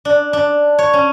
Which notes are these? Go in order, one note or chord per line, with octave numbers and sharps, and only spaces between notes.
D4
D4
C#5
C#4